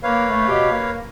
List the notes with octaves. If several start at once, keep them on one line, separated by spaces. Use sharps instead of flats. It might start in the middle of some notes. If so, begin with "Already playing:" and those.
A#3 B4 C#5 F5
A3
B2 G4
A#3